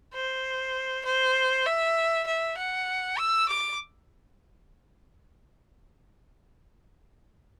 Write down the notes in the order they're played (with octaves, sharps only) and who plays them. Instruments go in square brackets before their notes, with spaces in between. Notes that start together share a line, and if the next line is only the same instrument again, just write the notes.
[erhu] C5
C5
E5
E5
F#5
E6
D6